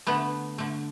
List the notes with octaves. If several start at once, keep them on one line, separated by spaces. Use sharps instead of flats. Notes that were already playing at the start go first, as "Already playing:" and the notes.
D3 A3 B3
D3 A3